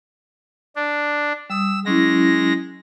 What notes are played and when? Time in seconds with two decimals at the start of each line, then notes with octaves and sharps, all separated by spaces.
0.76 D4
1.50 G3 D#6 E6
1.85 F#3 G#3 C#4 E4 A#6